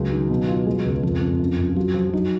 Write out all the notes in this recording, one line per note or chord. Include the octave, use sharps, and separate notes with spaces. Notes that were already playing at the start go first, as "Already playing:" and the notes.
Already playing: C#2 F#3 G#3
D#3
B2
F4
G#3
C#2
F2 F3
F2
F#2
F#2
F#3 F4
F3
F#3 D#4